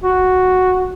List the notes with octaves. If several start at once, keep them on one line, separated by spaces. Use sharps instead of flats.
F#4